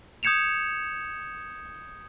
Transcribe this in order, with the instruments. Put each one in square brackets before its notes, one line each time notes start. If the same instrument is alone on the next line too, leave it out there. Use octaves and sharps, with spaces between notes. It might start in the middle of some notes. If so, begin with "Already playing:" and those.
[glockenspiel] D#6 G6 G#6 C#7 E7 F7